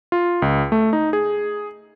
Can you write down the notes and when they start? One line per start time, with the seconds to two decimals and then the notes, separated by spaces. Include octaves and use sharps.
0.12 F4
0.42 C#2
0.72 A3
0.93 D#4
1.13 G#4